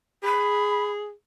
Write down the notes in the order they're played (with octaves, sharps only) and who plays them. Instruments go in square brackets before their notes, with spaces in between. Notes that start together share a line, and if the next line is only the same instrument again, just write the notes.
[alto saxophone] G#4 [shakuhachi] B5